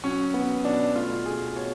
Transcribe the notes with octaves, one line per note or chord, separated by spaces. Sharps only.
F#3 C#4
F#3 B3
B2 D4
A3 F4
B2 G#4
B2 C#5